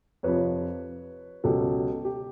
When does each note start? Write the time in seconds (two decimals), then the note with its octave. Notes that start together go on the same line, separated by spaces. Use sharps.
0.23 F2 C3 F3 B4 C#5
1.44 C#2 B2 F#3 G4 A4
2.05 G4